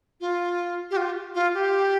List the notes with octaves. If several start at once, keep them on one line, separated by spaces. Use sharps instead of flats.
F4
G4
F4
F4
G4